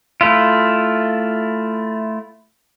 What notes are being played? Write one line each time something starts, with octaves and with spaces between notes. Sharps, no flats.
A3 E4 F4